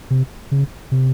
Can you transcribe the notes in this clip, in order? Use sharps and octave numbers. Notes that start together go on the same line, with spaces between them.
C3
C#3
C3